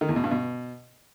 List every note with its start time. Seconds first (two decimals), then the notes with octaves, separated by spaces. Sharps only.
0.01 D#3
0.09 E2
0.16 B2
0.24 G2
0.31 B2